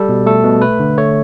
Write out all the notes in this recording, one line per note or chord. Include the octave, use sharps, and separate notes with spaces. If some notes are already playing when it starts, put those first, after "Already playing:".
Already playing: G3 A4
B2
A3 A4
B2
A3 B4
D3
A3 C#5